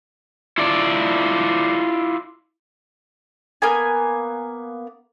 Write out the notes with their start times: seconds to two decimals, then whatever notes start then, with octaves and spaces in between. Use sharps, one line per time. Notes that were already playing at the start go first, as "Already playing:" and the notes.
0.58 E4 F4 A4 D5
3.62 A#3 B3 G#5